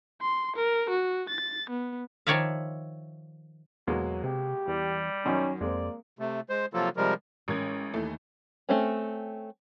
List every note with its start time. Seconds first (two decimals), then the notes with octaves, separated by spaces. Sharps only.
0.22 C6
0.56 A#4
0.90 F#4
1.29 A6
1.70 B3
2.27 D#3 F3 C#5 D5 E5 F5
3.87 E2 B2 F#3 G#3 A#3
4.24 C3 G4
4.67 E2 G3
5.26 F#2 D#3 F#3 C#4 D#4
5.61 F2 G#3 A#3 C4 D5
6.19 C3 A3
6.49 G#3 C5
6.74 C3 F3 F#3 A#3 F4 A4
6.97 C3 F3 G3 G#3 A#4
7.48 A1 G#3 C#4 A#4 G#6
7.94 D#2 E3 A3
8.69 A3 C4 C#4